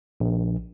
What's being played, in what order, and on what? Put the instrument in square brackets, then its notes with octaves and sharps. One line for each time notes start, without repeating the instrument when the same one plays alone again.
[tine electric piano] A#1